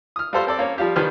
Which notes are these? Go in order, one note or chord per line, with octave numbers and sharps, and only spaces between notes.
D#6 F6
G3 F4 F#4 A4 C5 F5
C4 A4 D5
A#3 C#4
F3 G3 F4 G4
D#3 F3 G3 B4 C5 F6